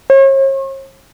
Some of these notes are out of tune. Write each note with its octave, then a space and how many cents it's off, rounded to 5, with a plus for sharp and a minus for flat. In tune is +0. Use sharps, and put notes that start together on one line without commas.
C#5 -40